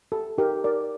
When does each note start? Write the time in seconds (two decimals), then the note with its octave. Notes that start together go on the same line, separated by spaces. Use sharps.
0.12 G4 A4
0.38 D#4 G4 A#4
0.64 D#4 A#4 D5